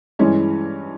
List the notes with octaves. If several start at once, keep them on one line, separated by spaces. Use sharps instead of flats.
G2 E3 G#3 C#4